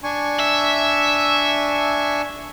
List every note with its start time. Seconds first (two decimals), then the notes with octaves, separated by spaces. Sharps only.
0.04 D4 G#5 C#6
0.39 E5